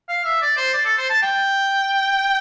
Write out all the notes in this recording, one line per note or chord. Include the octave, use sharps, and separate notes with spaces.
F5
E5
D5
C5
D5
A4
C5
A5
G5